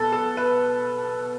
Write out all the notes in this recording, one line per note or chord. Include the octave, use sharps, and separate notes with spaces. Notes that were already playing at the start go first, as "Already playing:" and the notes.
Already playing: B2 B3 A4 B4
A4
B4